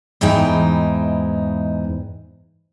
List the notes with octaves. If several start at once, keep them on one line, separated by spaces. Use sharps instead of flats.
E2 G#2 E3 D#4 G5